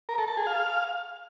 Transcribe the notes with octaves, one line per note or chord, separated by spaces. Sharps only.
A#4
A4
A5
G#4
F5